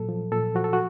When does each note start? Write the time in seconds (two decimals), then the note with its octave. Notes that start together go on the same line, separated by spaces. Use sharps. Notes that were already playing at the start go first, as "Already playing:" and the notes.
Already playing: A#2 F#3 A4
0.09 F3
0.32 A#2 A4
0.55 F3 F#4
0.64 A4
0.73 F#4